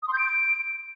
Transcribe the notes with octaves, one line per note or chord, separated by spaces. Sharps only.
D#6
C6
G6
D7